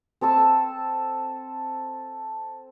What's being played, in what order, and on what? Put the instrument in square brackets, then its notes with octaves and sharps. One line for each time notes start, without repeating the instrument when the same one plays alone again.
[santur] C4 A4 A5 E6